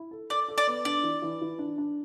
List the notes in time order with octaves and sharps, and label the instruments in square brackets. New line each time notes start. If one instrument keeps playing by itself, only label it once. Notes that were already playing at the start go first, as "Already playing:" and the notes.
Already playing: [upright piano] E4
A4
[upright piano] A4 [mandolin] D5
[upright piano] A4
[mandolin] D5
[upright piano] B3
[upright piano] D4 [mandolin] D5
[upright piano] E3
E3
E3
D4
D4